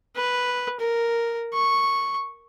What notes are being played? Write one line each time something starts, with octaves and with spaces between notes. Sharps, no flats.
B4
A#4
C#6